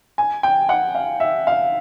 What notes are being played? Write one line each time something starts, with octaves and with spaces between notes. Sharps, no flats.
G#5
G5
F#5
F5
E5
F5